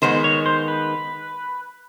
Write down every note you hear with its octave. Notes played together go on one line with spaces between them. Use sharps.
D#3 G#3 B3 C5
C#5
C5
B4